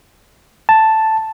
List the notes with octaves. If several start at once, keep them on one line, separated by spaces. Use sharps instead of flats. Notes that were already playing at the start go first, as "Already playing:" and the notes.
A5